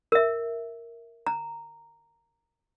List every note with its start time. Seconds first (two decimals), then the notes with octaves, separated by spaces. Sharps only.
0.12 A#4 E5
1.27 A#5